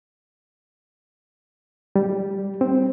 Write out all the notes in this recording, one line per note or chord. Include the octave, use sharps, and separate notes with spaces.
G3
C4